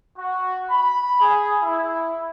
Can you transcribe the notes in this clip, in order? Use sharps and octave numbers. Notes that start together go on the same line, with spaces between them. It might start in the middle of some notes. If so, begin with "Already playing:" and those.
F#4
B5
G#4
E4